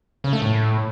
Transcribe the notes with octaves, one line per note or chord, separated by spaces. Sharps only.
C#3
A3
A2